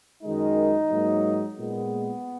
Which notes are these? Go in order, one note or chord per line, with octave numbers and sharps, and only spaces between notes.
F#2 D#3 G#3 D#4
G#2 F#3 A#3
A#2 G#3 B3